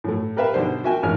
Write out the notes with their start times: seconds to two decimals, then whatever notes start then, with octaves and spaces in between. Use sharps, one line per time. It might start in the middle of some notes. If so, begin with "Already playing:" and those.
0.04 A2 F#3 A3
0.36 G4 A#4 B4 E5 F5
0.54 B1 D3 D4 C5
0.84 F#4 A#4 E5 G5 G#5
1.03 A1 G#2 D#3 C#5 G#5 F6